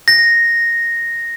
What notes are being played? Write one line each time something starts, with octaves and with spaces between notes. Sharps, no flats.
A#6